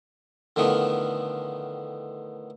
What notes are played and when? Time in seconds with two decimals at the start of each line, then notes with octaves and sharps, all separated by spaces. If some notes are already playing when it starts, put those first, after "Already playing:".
0.56 A2 D3 D#3 F3 B3